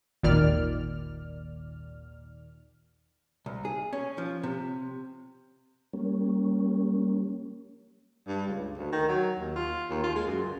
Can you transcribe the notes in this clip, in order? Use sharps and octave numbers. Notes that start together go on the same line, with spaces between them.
G#1 D#2 A#2 D#3 D5 F6
C2
G#4
C#4
F3
C3
G3 A#3 C#4
G2
C#2
D2
D#3
F#3
D#2
F4
D#2
F4
G#3
F#2
C#2